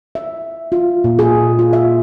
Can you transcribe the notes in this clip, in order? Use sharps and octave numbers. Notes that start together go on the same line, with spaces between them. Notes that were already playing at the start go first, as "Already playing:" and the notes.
E5
F4
A#2
G#4
F4
E5